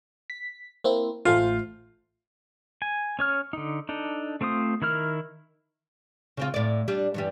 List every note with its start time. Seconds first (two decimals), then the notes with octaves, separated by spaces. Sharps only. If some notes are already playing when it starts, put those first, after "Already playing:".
0.30 B6
0.84 A#3 C4 E4
1.25 A1 A3 F4 C5
2.82 G#5
3.19 C#4 C#5 F6
3.53 D3 D#4
3.89 D4 D#4 A4
4.41 A3 C4 F4 C5 D#6
4.82 D#3 E4 A#4 F6
6.37 C#3 C4 F4
6.54 A2 D5
6.88 G3 D4
7.14 G2 E3 G3